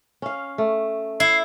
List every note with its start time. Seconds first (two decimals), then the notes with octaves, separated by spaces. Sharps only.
0.22 C#4 F5
0.58 A3
1.20 E4 C7